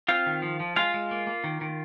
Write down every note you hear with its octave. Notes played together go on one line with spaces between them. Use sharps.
C4 F4 F5
D#3
F3
F3
G#3 F4 F5
G#3
A#3
A#3
D#3
D#3